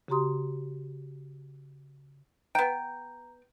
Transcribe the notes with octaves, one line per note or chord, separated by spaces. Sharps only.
C#3 F#4 G4 A#5 C6 D#6
B3 G5 A#5